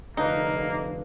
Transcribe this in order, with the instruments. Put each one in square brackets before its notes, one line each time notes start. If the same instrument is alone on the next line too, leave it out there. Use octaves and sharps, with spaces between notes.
[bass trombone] F1 [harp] D3 F4 B4 [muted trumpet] A#3 [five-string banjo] D#4